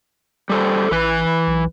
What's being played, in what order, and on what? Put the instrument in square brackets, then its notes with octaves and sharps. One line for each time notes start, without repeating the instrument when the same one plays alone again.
[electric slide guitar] G3 A4 C5
[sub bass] A1 [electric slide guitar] E3 B4
[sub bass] B1